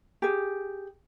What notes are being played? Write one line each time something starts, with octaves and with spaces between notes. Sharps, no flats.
G4 G#4